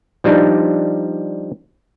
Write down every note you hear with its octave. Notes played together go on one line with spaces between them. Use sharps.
F3 G3 D4 D#4